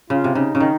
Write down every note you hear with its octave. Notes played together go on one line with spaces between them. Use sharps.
C#3 F4
C3
C#3 D#4
C#3
D#3